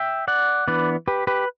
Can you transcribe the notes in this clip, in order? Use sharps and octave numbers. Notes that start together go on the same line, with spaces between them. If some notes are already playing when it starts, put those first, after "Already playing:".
Already playing: E5 G5
D5 F#5
E3 B3 D4 B4 D5
G4 B4
G4 B4